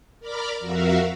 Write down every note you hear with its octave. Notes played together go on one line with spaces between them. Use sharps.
A#4 D5 B5 D6 F6
F2 F#4 A#4 E5 F5